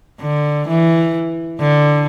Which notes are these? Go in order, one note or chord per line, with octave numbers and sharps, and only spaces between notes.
D3
E3
D3